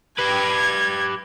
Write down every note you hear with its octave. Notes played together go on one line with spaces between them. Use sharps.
G4 B4 G#6